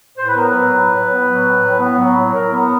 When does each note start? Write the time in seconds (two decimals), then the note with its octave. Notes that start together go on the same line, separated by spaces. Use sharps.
0.18 A2 C5
0.27 B4
0.36 B3 A#4
0.47 B4
0.54 F#3
0.72 A2
0.90 A2
1.08 B3
1.26 F#3
1.44 A2
1.62 A2
1.80 B3
1.98 F#3
2.16 A2
2.34 A2 A#4
2.52 B3 A#4